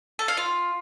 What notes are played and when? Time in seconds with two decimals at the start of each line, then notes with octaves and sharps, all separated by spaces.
0.19 A4
0.28 F5
0.37 F4